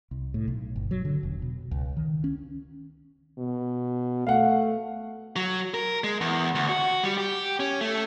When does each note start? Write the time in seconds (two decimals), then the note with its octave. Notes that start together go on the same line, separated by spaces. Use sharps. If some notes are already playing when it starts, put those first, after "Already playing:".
0.11 C2
0.34 A2
0.48 B1
0.76 G1
0.91 F#3
1.05 D3
1.23 E1
1.42 B2
1.71 C#2
1.97 D#3
2.24 C#4
3.38 B2
4.27 A3 F5 F#5
5.36 F#3
5.74 A#4
6.04 G#3
6.21 E2
6.55 D2
6.69 F#4
7.04 G3
7.18 G4
7.60 C#4
7.81 A3